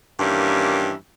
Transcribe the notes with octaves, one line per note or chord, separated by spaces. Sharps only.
G2 D#3 E3 G3 A#3 C#4